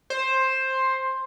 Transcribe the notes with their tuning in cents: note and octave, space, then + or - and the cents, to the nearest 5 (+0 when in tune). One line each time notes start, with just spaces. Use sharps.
C5 +10